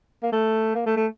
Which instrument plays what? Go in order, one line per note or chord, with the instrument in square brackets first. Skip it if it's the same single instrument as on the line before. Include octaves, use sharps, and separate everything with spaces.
[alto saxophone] A#3
A3
A#3
A3
A3